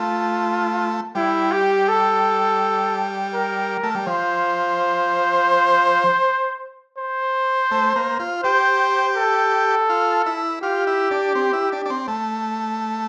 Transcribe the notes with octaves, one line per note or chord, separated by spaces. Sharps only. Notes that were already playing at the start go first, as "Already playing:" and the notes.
Already playing: A3 F4
G3 E4
G4
A4
A#4
A3
G3
F3 C5
C5
A3
A#3
F4
G4 C5
A4
F4
E4
F4 G4
E4
D4
C4
E4
D4
D4
C4
A3